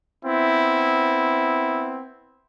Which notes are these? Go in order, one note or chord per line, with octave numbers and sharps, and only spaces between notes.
B3 C4 E4